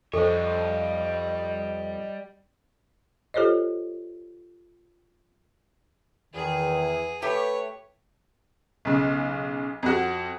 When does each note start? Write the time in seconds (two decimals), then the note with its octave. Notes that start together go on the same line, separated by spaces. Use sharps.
0.13 F2 G3 A4 C5 C#5 D#5
3.34 F4 G4 A4 C5 C#5 D#5
6.34 E2 D#3 G#4
7.22 A3 G4 B4 C#5 G5
8.85 B1 C#3
9.83 F2 F#4